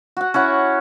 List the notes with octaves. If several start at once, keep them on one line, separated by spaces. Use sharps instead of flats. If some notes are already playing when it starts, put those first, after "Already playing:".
F#4 F#5
C#4 E4 F#5 C#6